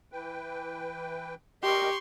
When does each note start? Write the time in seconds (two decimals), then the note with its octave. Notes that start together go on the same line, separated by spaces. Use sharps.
0.12 E3 B4 G5
1.63 G3 G4 A#4 D#5 C6 C#6